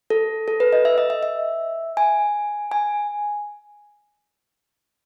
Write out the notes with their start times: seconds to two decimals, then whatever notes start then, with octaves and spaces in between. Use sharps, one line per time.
0.10 A4
0.48 A4
0.60 B4
0.73 D#5
0.85 E5
0.98 D#5
1.10 E5
1.23 E5
1.97 G#5
2.72 G#5